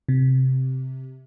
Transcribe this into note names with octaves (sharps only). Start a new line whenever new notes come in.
C3